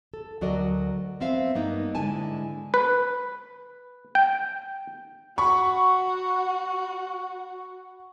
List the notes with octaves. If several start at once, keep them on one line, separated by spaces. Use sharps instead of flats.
A4
D2 F#3 F#4 A#4 D5 D#5
B3 C4 E5 F5
G2 A#3 B3 D#4
G#2 D3 G#3 E4 G#5 A5
B4
G5
F#4 B5 C#6